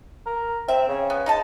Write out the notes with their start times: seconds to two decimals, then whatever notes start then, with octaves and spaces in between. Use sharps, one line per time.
0.26 A#4
0.68 C4 E5
0.88 C#3
1.10 B3
1.26 D#4 D#5 A5